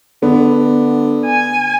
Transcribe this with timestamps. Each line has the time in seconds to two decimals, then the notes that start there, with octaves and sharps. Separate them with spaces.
0.23 D3 B3
1.26 G#5